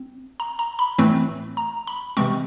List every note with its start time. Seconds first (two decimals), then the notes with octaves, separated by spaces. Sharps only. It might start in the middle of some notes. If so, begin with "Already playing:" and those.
Already playing: C4
0.40 A#5
0.59 A#5
0.79 B5
0.98 A2 E3 A3 C4
1.57 A#5
1.87 B5
2.17 C3 E3 G#3 C4 C#6